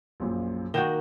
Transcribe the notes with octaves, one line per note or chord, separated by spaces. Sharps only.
A#1 F#2 A#2
D#3 A#3 F#4 G6 E7 G7